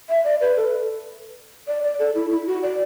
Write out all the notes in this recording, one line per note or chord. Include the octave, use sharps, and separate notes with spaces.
E5
D5
B4
A4
D5
D5
A4
E4
E4
F#4
D5